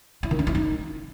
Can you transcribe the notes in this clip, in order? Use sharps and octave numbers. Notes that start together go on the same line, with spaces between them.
E4
D#3
D4
E4
D#4